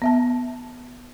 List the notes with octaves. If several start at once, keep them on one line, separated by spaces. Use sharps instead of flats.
B3 E5 A5